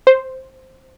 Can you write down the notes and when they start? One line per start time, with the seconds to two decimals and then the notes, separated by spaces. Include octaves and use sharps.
0.07 C5